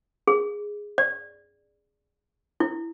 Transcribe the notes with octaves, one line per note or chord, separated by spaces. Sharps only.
G#4
D5
E4